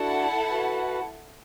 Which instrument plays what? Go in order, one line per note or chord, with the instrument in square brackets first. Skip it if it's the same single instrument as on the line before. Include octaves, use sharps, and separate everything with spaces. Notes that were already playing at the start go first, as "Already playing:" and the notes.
Already playing: [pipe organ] D4 F#4 [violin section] E4 A4 F#5 A5
[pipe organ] F#4 B4